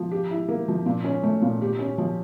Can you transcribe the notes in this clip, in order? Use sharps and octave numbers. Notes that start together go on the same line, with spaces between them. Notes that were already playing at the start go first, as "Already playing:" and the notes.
Already playing: F3
G4
E4
A#3
F3
A#2
C#4
A3
A#2
G4
C#4
F3